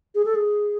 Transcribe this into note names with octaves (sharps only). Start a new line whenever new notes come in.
G#4
A4
G#4